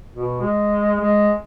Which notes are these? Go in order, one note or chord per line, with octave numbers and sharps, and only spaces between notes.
B2
G#3
G#3